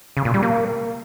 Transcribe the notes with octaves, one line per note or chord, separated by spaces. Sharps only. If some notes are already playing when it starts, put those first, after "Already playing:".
C#3
A#2
G3
A#3